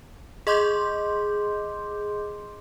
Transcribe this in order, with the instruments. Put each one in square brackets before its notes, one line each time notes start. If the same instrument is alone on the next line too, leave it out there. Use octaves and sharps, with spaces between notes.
[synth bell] G#4 D#5 C6 D6 G6